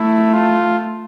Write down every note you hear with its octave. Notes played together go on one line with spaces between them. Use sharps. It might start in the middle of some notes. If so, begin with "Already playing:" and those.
Already playing: A3 E4
F4